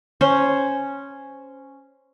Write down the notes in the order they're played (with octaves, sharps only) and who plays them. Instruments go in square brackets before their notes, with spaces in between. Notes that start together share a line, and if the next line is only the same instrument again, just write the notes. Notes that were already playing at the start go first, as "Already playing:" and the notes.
[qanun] C#4 C5 C#5